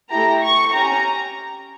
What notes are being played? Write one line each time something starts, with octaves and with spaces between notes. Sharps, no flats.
A3 E4 G4 A#5
C#6
C#4 G4 A#5